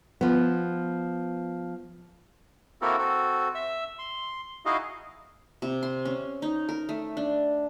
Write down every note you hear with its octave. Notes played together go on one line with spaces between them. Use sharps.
F3 B3
A#3 C4 E4 F#4 A4 A#4
C4 F#4 A4
E5 E6
C6
D#4 E4 F#4 G#4 D#5 F5
C3
C6
C#4
D#4
A#4
A3
D4